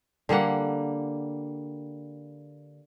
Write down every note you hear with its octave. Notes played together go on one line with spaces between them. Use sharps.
D3 G3 A#3 F#5